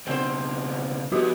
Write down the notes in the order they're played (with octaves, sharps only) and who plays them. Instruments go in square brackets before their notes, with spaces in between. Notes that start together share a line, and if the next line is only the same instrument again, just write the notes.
[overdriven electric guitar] C#2 B2 [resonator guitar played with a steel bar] C4 C5
[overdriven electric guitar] F2 B3 [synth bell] G3 F#4 G4